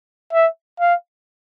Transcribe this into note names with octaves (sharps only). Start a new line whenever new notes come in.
E5
F5